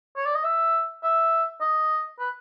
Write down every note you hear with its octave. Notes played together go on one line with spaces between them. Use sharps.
C#5
D5
D#5
E5
E5
D#5
B4